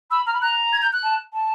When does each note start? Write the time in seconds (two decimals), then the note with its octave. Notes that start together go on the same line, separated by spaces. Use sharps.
0.11 B5 E6
0.26 A#5 F6
0.34 B5
0.42 A#5 F#6
0.73 G#6
0.82 G6
0.93 F#6
1.03 A5
1.33 A5